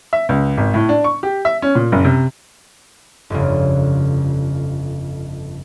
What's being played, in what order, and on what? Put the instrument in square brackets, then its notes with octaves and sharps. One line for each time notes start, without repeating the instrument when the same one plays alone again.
[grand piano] E5
C#2
G#1
A2
D4
C#6
G4
E5
C#4
A#2
F#1
C3
[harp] G1 F2 C#3